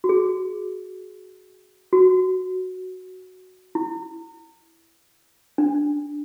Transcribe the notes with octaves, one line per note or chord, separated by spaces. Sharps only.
F#4
G#4
F#4
E4
D4